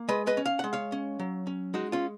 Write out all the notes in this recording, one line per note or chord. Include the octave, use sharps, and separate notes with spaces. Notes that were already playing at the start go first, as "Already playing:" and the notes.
Already playing: A#3
G#3 B4 D#5
B4 D#5
C#4
F5
G#3 F#5
C#5 F5
C#4
F#3
C#4
G#3 D#4 F#4
C#4 F4